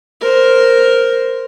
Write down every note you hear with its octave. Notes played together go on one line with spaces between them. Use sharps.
A#4 C5